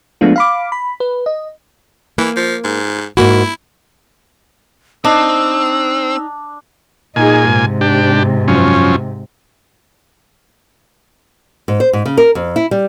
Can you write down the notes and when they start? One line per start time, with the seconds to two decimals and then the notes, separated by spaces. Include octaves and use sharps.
0.21 F3 G#3 A3 B3 D4 F4
0.36 F5 B5 D6
0.72 B5
1.00 B4
1.26 D#5
2.18 E3 A#3
2.36 F3
2.64 G#2
3.17 G#2 A#3 E4 F#4
5.04 C4 D4 D#4 E6
7.16 A#2 D#4 G#4 G#5
7.51 G#2 C3
7.81 D4 G4
8.48 F#2 F3 C#4
11.68 G#2
11.80 C5
11.93 G#2
12.06 C#3
12.18 A#4
12.35 F2
12.56 E4
12.71 G3